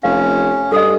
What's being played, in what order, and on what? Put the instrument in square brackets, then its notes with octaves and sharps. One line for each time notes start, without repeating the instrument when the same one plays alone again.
[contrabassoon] F1 [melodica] C#4 [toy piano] F5
[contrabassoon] G2 [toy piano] A4 D#5 [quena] D#6